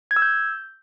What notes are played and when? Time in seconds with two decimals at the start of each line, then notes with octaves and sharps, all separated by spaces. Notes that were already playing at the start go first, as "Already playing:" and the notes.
0.11 G#6
0.16 E6
0.22 G6